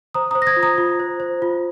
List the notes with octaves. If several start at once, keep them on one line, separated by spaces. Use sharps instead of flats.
C5 A#5 D#6
C5 A#5 D#6
A#6
D#6 G#6
F4
A#5 D#6
F4
C5
C5
F4